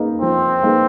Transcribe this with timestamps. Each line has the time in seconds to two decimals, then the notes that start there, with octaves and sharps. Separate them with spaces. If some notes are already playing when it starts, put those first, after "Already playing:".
Already playing: A#3 D#4 G#4 B4
0.22 F3 C4
0.63 A#3 D#4 G#4 B4